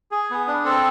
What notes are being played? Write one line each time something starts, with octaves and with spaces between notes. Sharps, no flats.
G#4
B3
D4
C4 A4